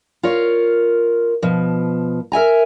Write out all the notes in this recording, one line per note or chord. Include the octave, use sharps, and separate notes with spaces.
F4 A#4 C#5
B2 F3
A#4 E5 G#5 A#5